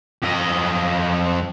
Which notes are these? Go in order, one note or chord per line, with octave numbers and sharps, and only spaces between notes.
F2 D#5